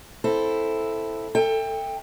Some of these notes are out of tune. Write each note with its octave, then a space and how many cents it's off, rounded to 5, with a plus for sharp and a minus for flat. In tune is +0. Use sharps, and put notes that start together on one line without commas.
C4 +0 E4 +0 A4 +0
A4 +20 E5 -15 G5 +25